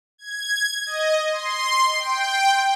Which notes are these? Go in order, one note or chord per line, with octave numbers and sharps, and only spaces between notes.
G#6
D#5
C6
G5